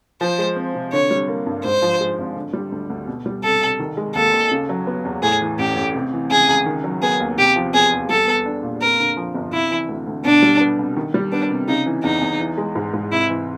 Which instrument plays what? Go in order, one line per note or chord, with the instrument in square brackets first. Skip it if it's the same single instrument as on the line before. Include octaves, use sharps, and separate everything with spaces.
[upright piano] F3 [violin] C5
[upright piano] G#3
C4
C3
[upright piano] D3 [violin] C#5
[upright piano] G3
A#3
G2
[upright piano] G#2 [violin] C5
[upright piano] F3
G#3
G#1
D3
G3
D2
D2
B2
G3
[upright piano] C2 [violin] A4
[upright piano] C2
D#3
G#3
[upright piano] D#2 [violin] A4
[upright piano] D#2
C#3
F#3
B3
E2
[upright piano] A2 [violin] G#4
[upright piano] E3
[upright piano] A1 [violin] G4
[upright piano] A1
C3
E3
[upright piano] C#2 [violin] G#4
[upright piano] C#2
D#3
F#3
[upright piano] B3 [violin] G#4
[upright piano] D#2
[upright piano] C3 [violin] G4
[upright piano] F3
[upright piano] E2 [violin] G#4
[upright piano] E2
[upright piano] G3 [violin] A4
[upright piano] B3
D4
A#2
[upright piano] F2 [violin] A#4
[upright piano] D3
F3
G1
[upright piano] C3 [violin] E4
[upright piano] E3
D2
D2
[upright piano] B2 [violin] D4
[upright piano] G3
B3
C2
D#3
G3
[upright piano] B3 [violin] D4
[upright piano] C3
[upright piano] C#3 [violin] D#4
[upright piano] E3
[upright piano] E2 [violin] D#4
[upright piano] E2
E3
G#3
G#2
G#2
[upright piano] C3 [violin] E4
[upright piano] E3